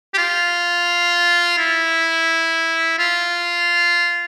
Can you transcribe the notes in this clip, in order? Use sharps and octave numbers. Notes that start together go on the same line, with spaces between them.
G4
F4
E4
F4